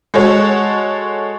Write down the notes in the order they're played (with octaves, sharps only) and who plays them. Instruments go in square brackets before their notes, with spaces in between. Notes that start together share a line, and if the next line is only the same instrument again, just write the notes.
[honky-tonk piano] G#3 F#4 A4 C#5